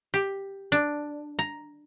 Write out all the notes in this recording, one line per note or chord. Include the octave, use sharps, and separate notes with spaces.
G4
D4
A#5